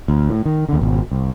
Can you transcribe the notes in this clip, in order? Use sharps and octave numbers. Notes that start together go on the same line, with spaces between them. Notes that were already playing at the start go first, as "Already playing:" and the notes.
D2
A2
D#3
D#2 D3
G#1 B2
C2